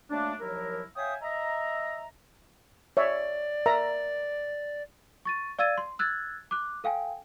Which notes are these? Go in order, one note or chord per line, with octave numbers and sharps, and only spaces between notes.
F#3 A3 A#3 D4
D#2 F3 F#3 E4 A#4
C#5 E5 F5 G5 G#5 D#6
D#5 E5 A#5
C#5 D5 E5
A#4 E5 A#5
C#6 A6 D#7
D5 F5 E6 G#6 A6 D#7
C6
E6 F#6 G#6 A6
D6 F#6
A4 F5 G5 G#5